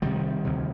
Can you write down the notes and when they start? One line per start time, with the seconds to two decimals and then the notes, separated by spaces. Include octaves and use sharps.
0.02 C2 C3 D#3 G3
0.45 D2 C3